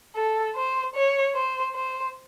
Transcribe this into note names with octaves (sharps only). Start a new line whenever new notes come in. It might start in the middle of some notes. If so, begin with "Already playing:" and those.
A4
C5
C#5
C5
C5